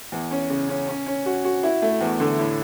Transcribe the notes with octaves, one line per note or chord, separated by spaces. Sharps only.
E2
C#4
C#3
C#4
C#4
C#4
F#4
F#4
E4
A3
E2
D3
A2